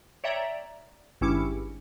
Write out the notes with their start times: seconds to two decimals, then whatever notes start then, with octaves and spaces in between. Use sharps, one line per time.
0.24 C#5 D5 E5 G5 A#5
1.21 G#1 G2 C#4 E4 D6 C#7